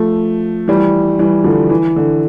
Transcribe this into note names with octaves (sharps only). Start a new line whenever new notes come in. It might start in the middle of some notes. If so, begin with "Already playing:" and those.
Already playing: F3 A3
E3 G3
E3 G3
D3 F3
E3
D3